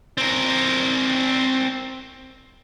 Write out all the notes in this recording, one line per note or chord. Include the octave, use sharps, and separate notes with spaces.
C4 A#4